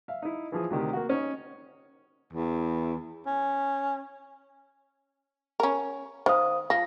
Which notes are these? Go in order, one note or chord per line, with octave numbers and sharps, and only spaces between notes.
E5 F5
D#4 E4
E3 F3 G#4
D2 C3 D#3 G4
A#3 F#4
C#4 D#4
E2
C#4
C#4 A#4
D#3 C5 F5 D#6
F3 A#6